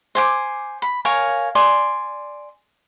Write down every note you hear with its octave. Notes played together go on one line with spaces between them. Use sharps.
C5 G#5 D6
B5
A#4 C#5 F5 G#5
D5 G#5 C6